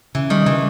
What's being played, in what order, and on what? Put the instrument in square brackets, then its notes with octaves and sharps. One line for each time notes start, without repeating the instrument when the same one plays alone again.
[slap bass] C#3 [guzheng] E3
[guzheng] D#3 [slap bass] G3
[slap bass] C#3 [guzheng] E3